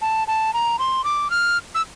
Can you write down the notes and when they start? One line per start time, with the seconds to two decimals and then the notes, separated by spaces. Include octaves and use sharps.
0.01 A5
0.27 A5
0.53 A#5
0.79 C6
1.04 D6
1.30 F6
1.75 E6